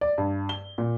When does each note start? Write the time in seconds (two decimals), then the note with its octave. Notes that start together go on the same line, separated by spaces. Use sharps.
0.01 D5
0.18 G2
0.49 G7
0.78 A#2